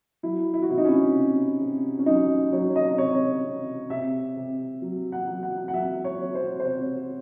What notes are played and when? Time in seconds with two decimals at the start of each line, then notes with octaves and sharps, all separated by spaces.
0.23 F#3 E4
0.54 E4
0.62 F#4
0.69 C3 E4
0.78 D#4
0.84 C#4
1.15 C3
1.61 C3
1.99 C#4
2.06 F#3 D#4
2.52 F#3 C#5
2.76 D#5
2.98 C3 C#5
3.44 C3
3.90 C3 E5
4.37 C3
4.82 F#3
5.12 F#5
5.28 F#3
5.43 F#5
5.68 F#5
5.73 F#3 E5
6.04 C#5
6.19 F#3
6.35 C5
6.60 C5
6.65 C3 C#5